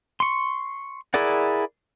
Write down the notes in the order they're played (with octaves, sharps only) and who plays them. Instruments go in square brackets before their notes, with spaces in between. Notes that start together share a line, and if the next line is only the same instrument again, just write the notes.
[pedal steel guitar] C6 C#6
E4 G#4 A#4 D5 F#5